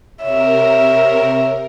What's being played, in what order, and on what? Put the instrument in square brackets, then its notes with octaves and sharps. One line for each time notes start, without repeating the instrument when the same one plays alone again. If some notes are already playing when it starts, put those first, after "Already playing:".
[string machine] C3 A#4 [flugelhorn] C#5 [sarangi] E5